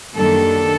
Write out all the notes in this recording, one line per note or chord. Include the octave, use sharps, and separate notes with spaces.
F#2 D#3 G3 A#3 D4 A4